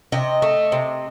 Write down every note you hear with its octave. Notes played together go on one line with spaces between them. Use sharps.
C3 D#5
A3
C3